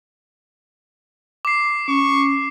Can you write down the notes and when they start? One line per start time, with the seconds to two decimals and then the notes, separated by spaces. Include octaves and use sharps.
1.45 D6 C7
1.88 C#4 C#6